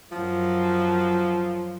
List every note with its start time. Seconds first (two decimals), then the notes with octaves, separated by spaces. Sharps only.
0.12 F#2 F3 F#3